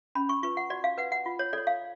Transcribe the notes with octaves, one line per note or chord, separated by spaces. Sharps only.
C#4 B5
C#6
F4 B4 C#6
F#5
F#4 D5
F5
B4 F#5
F#5
F4
C#5
A4 C#5 D5
F5